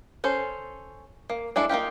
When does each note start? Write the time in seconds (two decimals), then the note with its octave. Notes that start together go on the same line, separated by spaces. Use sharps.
0.24 C#4 A4 C5
1.30 A#3
1.56 G#3 D4 E4 A4
1.69 A#3 D#4 F4 G4